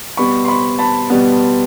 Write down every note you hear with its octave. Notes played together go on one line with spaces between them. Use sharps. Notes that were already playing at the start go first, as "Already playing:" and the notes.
B2 G3 B3 B5 C#6
C6
B5 C#6
A5 B5
B2 G3 B3